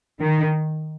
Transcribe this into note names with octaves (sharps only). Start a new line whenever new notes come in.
D#3